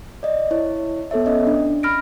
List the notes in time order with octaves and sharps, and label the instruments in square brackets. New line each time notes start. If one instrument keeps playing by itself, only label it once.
[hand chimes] D5 D#5
E4 C#5
B3 A4 C#5 E5
C#4 D#5
D4
C#4 B5 F6 A#6 D7